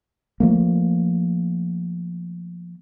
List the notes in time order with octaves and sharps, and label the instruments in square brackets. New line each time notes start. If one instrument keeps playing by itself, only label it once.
[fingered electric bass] F3 A3 A#3